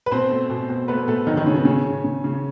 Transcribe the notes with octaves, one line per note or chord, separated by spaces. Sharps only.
B4
B2 C4 C5
A3
B2
B2
A3 B3 B4
B2 A3 A4
D#3 F#3 D#4
D#3 D#4
C#3 A3 C#4
B3
C#3 C#4
C#3
C#3
C#3